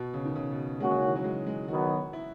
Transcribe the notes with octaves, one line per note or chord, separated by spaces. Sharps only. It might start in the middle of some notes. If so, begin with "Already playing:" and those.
Already playing: B2
C#3
D#3
C#3
B2
G#3 A#3 C#4 F#4
C#3
D#3
E3
F#3
G#3
G#3
D#3 F#3 B3 F#4
E4